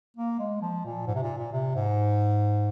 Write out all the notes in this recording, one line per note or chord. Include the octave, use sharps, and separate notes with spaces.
A#3
G#3
F3
A#2
G#2
C3
A#2
A#2
C3
G#2